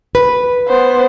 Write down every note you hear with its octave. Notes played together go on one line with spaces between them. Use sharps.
B4
B3 C5